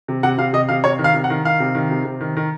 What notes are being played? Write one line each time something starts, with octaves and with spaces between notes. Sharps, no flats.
C3
C3 F#5
C3 F5
C3 D#5
C3 F5
C3 C#5
D#3
F5
C3
F#5
D#3
D#3 F5
C3
D#3
C3
C3
D#3
D#3